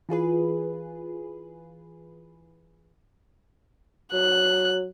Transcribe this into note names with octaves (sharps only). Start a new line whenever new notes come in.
E3 F4 G#4 B4
F#3 F#6